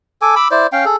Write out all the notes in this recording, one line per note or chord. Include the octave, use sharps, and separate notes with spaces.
A4 G#5 D6
B5 D6 E6
E4 C5 D5
C#4 F5 G5
G#4 A4